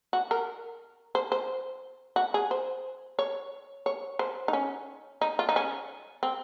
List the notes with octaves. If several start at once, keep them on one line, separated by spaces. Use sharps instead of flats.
F#4
A#4
C5
C5
F#4
G#4
C5
C#5
C#5
C5
D#4
C#4
D#4
F4
D#4
C#4
C4